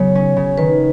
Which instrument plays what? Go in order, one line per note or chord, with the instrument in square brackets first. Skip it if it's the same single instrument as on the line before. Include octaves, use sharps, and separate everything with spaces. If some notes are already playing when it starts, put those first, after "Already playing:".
Already playing: [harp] C#3 F#3 B3 [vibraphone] C#5
[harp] C#4
C#3
[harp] D#3 [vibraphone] B4